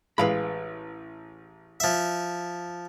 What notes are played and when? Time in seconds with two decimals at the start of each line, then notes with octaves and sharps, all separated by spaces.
0.18 A1 G#3 B4 F5 B5
1.80 F3 E5